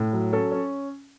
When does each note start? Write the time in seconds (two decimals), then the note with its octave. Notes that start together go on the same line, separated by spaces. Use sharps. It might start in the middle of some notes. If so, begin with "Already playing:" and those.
Already playing: A2
0.13 F#3
0.33 C#4 A4
0.52 C#4